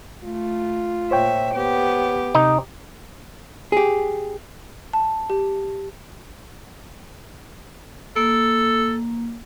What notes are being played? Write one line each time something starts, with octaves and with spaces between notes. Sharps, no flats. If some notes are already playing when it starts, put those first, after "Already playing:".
A3 F4
A#2 C5 C#5 E5 G5
B3 G4
C3 D#4
G4 G#4
A5
G4
A#3 A4